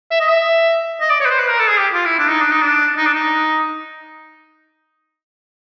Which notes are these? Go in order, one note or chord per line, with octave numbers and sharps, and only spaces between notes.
E5
D#5
E5
D#5
D5
C#5
B4
C5
B4
A#4
A4
G#4
G4
F4
E4
D4
D#4
D4
D#4
D4
D#4
D4
D#4